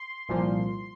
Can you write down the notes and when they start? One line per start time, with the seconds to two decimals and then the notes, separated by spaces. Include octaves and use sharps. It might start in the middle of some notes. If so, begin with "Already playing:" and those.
Already playing: C6
0.29 C2 A#2 F3